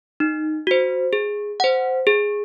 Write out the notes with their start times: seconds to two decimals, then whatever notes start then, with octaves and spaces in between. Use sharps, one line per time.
0.20 D#4
0.67 F#4 C5
1.13 G#4
1.60 C5 F#5
2.07 G#4